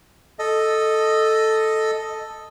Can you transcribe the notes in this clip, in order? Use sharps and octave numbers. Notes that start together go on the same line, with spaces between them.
A4 D#5